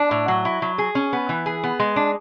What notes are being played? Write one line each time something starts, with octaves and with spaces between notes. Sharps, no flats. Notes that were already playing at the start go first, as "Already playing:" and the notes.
Already playing: D4
A2
F#3
E4
F#3
G#4
C#4
B3
E3
G#4
B3
G#3
D4